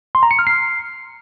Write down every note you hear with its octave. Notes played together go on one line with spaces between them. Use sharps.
C6
A#5
C#7
F6
C7